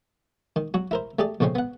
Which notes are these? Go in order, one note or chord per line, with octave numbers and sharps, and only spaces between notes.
D#3
F#3 F#4
E4 A#4 C5
A3 G4 G#4 D5
A#1 A2 C#3 C4 C#4
B3 F#5